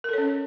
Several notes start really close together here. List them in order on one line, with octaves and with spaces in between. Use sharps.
A#4 A4 C#5 C#4